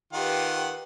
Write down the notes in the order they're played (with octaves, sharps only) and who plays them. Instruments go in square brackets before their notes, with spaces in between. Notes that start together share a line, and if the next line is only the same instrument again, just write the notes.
[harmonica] D#3 F4 F#5 [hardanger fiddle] G4 B4